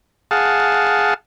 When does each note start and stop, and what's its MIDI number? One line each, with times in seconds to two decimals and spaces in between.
0.31 1.14 68
0.31 1.14 77
0.31 1.14 78
0.31 1.14 81